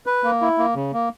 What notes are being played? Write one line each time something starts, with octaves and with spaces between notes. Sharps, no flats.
B4
A#3
E4
A#3
C#3
A#3